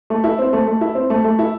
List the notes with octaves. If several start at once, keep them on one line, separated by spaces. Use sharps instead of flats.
A3
E4
C4
A3
A3
E4
C4
A3
A3
E4